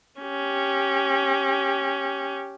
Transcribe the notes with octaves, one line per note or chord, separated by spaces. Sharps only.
C#4 G4